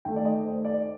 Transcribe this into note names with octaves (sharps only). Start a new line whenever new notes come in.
D#2 D#3 A3 G5
D5
D#5
C5
D5